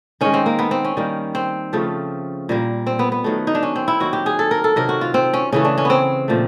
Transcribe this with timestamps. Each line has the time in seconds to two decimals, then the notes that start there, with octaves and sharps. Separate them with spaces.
0.21 D#3 G#3 C#4
0.34 C4
0.46 A#3
0.59 B3
0.71 C4
0.85 C#4
0.97 D#3 G3 A#3
1.35 C4
1.73 C#3 F3 A3
2.49 A#2 G3 A#3
2.86 C4
2.99 B3
3.12 B3
3.24 D#3 F#3 A3
3.47 D#4
3.55 D4
3.63 C#4
3.76 C4
3.88 E4
4.00 D#3 F#3 A#3 F#4
4.13 G4
4.26 G#4
4.39 A4
4.51 A#4
4.64 A4
4.76 C3 D#3 F#3 A#4
4.89 F#4
5.01 F4
5.14 C4
5.34 C#4
5.52 C#3 E3 A3 C#4
5.65 D4
5.78 C#4
5.85 B3 C4
6.28 A#2 F3 A3